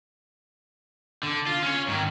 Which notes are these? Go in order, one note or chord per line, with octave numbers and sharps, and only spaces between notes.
D3
F4
C#4 C#5
G#2 D#3